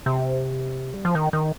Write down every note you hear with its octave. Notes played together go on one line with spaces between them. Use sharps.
C3
G3
F3
D#3
D#3